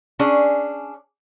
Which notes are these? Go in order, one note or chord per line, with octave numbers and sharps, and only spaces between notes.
C#4 D4 G#4